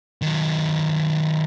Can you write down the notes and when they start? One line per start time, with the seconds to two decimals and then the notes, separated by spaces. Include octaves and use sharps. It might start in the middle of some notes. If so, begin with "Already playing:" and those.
0.22 D#3 F#3